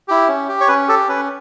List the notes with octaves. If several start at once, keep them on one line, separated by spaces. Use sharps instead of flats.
E4 G4
C#4
G4
C#5
C#4 B4
G4 A4
C#4 B4